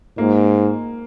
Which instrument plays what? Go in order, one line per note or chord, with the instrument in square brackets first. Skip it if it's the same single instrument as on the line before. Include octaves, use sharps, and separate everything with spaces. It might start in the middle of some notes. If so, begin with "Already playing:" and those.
[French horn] G#2 [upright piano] A#3